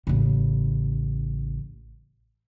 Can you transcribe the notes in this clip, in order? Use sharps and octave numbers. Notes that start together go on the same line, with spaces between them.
A1 C#3